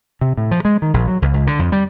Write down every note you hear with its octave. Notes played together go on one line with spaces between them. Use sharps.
C3
A2
F3
G#3
D#3
A#1
F#3
C#2
C#2
D3
F2
G3